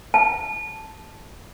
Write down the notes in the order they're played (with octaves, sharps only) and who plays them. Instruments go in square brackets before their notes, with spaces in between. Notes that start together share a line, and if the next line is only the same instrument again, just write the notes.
[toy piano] A5